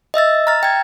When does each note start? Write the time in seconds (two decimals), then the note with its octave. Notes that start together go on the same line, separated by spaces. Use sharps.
0.14 D#5 E5 E6 A6
0.47 A#5 F6 A6
0.63 G5 G#6